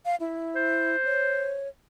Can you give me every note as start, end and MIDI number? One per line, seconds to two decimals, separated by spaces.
0.05 0.15 77
0.20 0.96 64
0.56 1.61 72
1.05 1.68 73